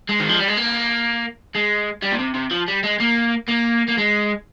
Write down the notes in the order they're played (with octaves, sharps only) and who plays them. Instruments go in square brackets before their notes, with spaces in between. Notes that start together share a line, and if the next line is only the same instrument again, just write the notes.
[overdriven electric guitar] G#3
D#3
F3
G3
G#3
A#3
G#3
G3
A#2
C3
C3
F3
G3
G#3
A#3
A#3
A#3
G#3